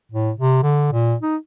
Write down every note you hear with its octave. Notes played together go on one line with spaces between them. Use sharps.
A2
C3
D3
A#2
D#4